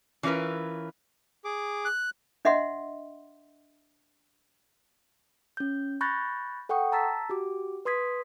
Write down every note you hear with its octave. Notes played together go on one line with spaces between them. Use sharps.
E3 C#4 F4 A#4 B4
G#4 D6
F#6
D4 D#5 E5 F#5 C6
C#4 G6
B5 C#6 F#6 G6 A6 A#6
A4 F#5 G5 C#6 D#6
A5 A#5 E6 A6 B6
F#4 G4 D6
B4 C6 D#6 G#6 B6